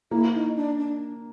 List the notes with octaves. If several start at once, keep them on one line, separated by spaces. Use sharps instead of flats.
A#3 E4
D#4
D4
D4